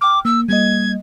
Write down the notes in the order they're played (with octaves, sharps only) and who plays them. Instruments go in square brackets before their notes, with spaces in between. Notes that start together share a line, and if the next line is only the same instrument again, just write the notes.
[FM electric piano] G5 F6 [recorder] D6
[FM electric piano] A#3 [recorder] E6
[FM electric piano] G3 A#3 D#5 [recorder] G#6